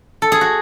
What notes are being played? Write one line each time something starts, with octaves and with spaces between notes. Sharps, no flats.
A4
G#4
F#4